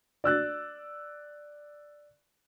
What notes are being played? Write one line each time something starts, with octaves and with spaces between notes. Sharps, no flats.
D5 E6 F#6 A6